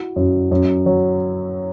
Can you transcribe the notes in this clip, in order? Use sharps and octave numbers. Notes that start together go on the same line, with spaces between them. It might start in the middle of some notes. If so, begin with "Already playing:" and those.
Already playing: E4 F#4
F#2
F#2
F#3